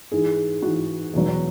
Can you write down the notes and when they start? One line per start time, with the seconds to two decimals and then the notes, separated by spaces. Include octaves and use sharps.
0.12 G#2 E3 G#4
0.62 G#2 E3 F#4
1.13 E2 B2 F#3